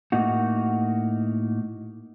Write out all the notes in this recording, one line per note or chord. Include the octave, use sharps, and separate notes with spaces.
A2 A#3 D#4 F#4